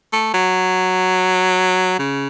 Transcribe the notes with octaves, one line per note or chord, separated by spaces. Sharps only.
A3
F#3
C#3